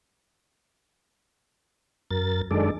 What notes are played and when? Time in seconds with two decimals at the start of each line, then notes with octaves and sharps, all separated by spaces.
2.11 F#2 A#4 A6
2.51 F#2 D#3 G#3 D4 A4 D5